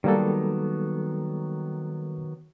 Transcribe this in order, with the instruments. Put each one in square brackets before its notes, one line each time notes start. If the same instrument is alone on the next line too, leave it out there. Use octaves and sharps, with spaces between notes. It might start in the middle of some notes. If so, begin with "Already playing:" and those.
[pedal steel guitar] D#3 F#3 B3 [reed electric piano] G3 A#3 A4